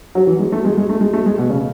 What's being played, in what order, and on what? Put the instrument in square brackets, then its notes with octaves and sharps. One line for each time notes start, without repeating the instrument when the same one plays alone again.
[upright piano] F#3
E3
G#3
A3
G#3
G#3
A3
G#3
A3
G#3
B2
C#3